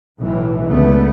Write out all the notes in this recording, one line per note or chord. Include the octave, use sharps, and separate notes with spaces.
B1 A2 E3
C#2 D3 A3 B3